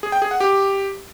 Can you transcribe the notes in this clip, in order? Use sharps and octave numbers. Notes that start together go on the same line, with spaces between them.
G#4
G5
G#4
F#5
G4